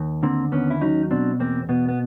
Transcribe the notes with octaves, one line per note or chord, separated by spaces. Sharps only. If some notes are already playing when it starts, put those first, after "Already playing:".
Already playing: D#2
D3 A#3 C4
D#2 B3 C#4
E4
F#3 C#4 D#4
B2 C4 D4
E2 A#3 C4
B2 B3
B3